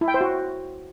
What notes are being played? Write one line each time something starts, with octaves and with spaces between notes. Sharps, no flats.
E4
G5
C5
F#4